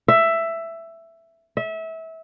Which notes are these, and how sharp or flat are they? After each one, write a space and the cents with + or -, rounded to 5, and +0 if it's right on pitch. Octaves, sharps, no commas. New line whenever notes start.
E5 +10
E5 -25